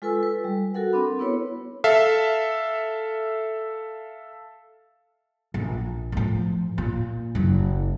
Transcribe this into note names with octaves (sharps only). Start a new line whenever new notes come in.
G#3 F4 A4 B4 G#5 E6
B4
G3
F#4 A4 A#4 F#5
C4 D4 B5
B3 E4 B4 C#5
A4 E5 F5
A#1
A2 F3
A#2
F#1 F#3